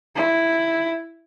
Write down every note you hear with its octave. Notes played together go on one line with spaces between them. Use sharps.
E4